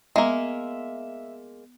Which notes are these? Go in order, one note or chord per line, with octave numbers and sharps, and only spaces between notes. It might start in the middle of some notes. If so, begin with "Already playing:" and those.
G#3 A#3 B3 E5